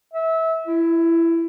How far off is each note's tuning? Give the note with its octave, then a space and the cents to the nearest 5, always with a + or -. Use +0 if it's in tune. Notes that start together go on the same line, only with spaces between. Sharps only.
E5 -25
E4 +15